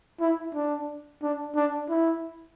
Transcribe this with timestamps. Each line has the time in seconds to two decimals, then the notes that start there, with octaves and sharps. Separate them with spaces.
0.21 E4
0.55 D4
1.23 D4
1.55 D4
1.90 E4